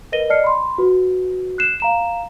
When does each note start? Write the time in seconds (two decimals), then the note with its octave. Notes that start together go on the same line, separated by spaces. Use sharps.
0.12 A#4 B4 D#5 A#6 D#7 G7
0.30 D5 D#5 A5 F6 C7 C#7
0.44 B5 C6
0.78 F#4 B4
1.58 F#6 C7 E7
1.80 F5 A#5 E7